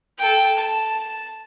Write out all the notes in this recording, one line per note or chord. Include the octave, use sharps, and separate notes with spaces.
A4 G5
A5